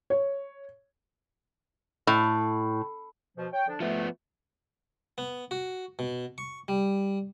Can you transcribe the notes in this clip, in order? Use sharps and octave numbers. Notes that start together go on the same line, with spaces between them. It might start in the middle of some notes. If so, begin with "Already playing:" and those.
C#5
A2
B2 F3
C#5 G5
D3 F3 D4
F3 A3 B3
B3
F#4
B2
C#6
G3